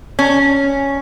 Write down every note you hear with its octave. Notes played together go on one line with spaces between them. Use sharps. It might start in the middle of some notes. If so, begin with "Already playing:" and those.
C#4